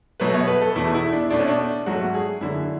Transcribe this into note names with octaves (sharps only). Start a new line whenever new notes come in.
B2 F#3 A3 B4
C#5
B4
A4
E2 B2 A3 E4
E4
D4
B2 A3 D4
C#4
D4
G#2 F#3 A3 F#4
G#4
F#2 D3 F#3 E4